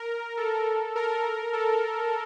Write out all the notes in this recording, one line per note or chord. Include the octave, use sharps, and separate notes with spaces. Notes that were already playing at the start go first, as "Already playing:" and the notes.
Already playing: A#4
A4
A#4
A4